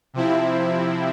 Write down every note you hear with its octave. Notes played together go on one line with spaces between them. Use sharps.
C3 F3 C4 E4